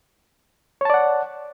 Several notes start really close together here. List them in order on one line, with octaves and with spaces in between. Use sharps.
C#5 A5 D5 F#5